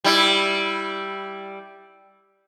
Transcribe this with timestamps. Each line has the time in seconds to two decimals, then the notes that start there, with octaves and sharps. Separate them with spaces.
0.04 G3 E4